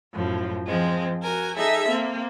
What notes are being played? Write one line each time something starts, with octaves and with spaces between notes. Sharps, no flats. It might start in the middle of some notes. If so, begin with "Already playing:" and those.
F#2 A2 F3
F3 G#3 C4
F#4 A#4 G#5
D#4 G#4 A4 E5
A#3 C4